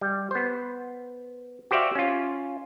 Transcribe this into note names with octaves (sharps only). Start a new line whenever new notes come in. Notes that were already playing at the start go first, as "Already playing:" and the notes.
G3
B3 C5
F#4 G4 C5 D5 E5 F5
C#4 F4